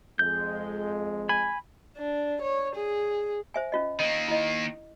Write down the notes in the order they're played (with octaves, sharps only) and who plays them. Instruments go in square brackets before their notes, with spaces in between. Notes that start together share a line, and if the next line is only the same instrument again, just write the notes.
[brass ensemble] F2 G#3 [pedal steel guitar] G6
[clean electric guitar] G#5 [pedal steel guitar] B5
[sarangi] D4
C#5
G#4
[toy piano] C5 E5 G#5
C#4 F4 D#5
[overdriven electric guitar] D#3 A#3 [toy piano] D#5
[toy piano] E4 D#5